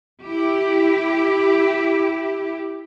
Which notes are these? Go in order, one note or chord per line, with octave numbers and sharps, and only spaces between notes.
E4 G4